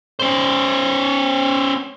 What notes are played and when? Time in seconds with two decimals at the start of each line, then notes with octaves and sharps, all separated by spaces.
0.19 C#4 C5